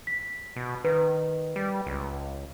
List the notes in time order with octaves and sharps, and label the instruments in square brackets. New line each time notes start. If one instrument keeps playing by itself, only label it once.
[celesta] B6
[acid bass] B2
[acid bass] D#3 [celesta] B4
[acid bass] G3
C#2